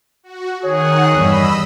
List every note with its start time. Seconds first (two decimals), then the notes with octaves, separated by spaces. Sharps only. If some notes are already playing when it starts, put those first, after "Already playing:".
0.23 F#4
0.63 D#3 G#4 C#5 F#5
1.13 E2 G2 D#5 B5 E6